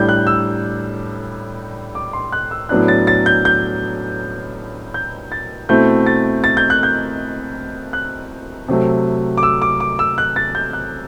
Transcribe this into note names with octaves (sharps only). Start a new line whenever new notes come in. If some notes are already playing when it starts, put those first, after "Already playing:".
Already playing: A2 G3 D4 G6
F#6
E6
D6
C6
F#6
E6
A2 F#3 B3 D4 F#6
A6
A6
G6
G6
G6
A6
B2 A3 C4 E4 G6
A6
A6
G6
F#6
G6
F#6
C3 F#3 A3 C4
D6
E6
D6
D6
E6
F#6
A6
G6
F#6